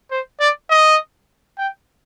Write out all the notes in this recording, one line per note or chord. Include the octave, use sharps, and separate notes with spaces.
C5
D5
D#5
G5